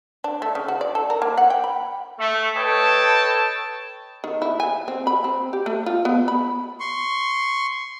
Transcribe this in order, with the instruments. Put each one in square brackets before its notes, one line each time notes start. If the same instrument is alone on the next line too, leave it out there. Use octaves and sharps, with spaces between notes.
[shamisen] D4
A3
C#3
F#4
D5
A4
A#4
A#3
F#5
G5
B5
[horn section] A3
A4 B4 C#5 D#5 G5 A5
[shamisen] D#3
E4
G#5
C4
B5
C4
G4
A3
F4
B3
B5
[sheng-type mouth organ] C6 C#6